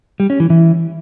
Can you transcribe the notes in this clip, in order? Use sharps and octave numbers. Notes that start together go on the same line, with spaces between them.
G3
C#4
E3
E3